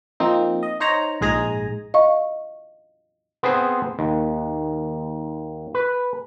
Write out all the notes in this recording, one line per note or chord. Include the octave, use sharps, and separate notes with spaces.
F3 A#3 C4 D#4
D#5
D#4 C5 C#5 A#5
A#1 G#2 G#3 G#4 G#5 A#5
D#5 F5 C#6
B3 C4 G#4 C5
D#2
B4